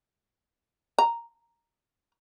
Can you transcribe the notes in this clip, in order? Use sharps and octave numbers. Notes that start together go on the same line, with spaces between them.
A#5